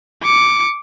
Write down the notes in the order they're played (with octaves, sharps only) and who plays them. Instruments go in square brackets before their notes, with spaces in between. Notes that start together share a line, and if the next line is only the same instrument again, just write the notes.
[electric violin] D6 C#7